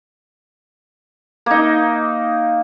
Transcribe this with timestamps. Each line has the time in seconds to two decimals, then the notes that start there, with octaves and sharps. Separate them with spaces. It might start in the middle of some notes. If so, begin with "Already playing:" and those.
1.46 A#3 D#4